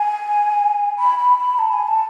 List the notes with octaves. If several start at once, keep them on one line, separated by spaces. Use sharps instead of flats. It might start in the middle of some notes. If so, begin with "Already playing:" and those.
Already playing: G#5
B5
B5
B5
A5
G#5
A5